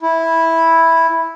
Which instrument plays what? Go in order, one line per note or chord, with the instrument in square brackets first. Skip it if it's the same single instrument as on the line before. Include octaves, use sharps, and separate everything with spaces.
[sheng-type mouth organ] E4